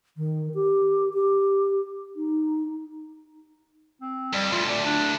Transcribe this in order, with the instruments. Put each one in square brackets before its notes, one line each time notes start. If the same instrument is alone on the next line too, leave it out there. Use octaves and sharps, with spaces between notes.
[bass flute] D#3
G4
G4
D#4
[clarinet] C4
[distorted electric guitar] F2 [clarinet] G3
[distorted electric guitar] D2 A2 [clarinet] F4
[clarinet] D5
D4